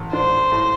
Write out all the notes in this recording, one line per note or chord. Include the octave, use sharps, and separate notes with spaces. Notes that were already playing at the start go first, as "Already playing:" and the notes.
Already playing: A1
D4 C5
A2